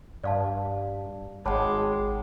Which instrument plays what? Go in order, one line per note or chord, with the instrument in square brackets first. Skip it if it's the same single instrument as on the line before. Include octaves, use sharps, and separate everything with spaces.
[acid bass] G2 [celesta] D5 F5 A5
[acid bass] G#1 [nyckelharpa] G#3 [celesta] C#5 A5 B5 [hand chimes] F#5 G5 D6